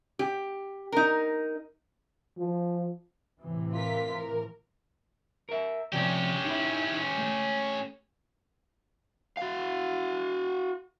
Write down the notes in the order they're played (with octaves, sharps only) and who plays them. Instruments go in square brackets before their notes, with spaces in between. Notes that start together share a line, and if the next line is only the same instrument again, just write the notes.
[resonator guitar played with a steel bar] G4
D#4 A#4
[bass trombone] F3
[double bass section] A2 C3 E3
[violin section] F4 A#4 B6
A#4
[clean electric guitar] A#4 E5
[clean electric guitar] C3 F3 D5 [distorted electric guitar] C#4 G4
[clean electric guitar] D#4 E4
A3
[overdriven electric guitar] F#4 F5